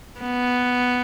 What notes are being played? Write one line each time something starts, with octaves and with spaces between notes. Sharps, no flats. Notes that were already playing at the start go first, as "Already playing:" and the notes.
B3